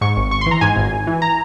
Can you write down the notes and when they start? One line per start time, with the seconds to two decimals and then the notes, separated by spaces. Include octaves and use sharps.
0.01 G#2 C#6
0.16 G#1
0.31 G#1 C#6
0.41 E3 C6
0.51 A#5
0.61 G#2 G#5
0.76 G#1
0.91 G#1
1.07 E3
1.22 A#5